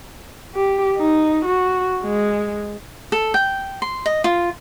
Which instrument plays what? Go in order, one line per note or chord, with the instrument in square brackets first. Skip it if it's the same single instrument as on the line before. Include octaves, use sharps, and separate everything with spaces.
[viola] G4
D#4
F#4
G#3
[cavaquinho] A4
G5
C6
D#5
F4